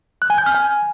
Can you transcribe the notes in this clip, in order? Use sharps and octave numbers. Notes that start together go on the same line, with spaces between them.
F#6
G#5
G6
F6
G#5